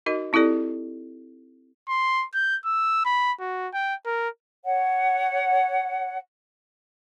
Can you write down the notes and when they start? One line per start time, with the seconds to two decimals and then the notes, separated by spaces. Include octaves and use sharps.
0.06 D#4 F#4 A#4 D#5
0.33 C4 E4 G4 A4 D5
1.88 C6
2.34 G6
2.65 E6
3.05 B5
3.40 F#4
3.73 G5
4.06 A#4
4.65 C#5 F#5